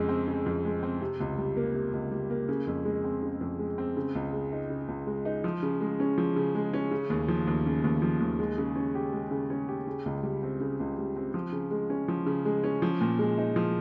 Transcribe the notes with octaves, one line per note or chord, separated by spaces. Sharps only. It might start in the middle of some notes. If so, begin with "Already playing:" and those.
Already playing: F2 C#3 G#3
C4
C#3
F2
G#3
C4
C3
C#2
G3
A#3
C3
C#2
G3
A#3
C#3
F2
G#3
C4
C#3
F2
G#3
C4
C#3
C#2
G#3
D#4
C#3
C#2
G#3
D#4
F3
C#3
G#3
C#4
F3
C#3
G#3
C#4
C#3
D#2
F3
D#2
C#3
D#2
F3
D#2
G#3
C#3
C#4
G4
G#3
C#3
C#4
G4
C#3
C#2
G3
C4
C#3
C#2
G3
C4
F3
C#3
G#3
C#4
F3
C#3
G#3
C#4
F3
A#2
G#3
D#4
F3